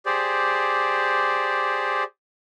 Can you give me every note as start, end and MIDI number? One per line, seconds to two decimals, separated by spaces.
0.06 2.04 67
0.06 2.04 68
0.06 2.04 72
0.06 2.04 74